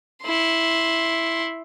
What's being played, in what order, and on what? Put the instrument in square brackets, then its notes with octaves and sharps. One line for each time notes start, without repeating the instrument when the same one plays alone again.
[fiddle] E4 C6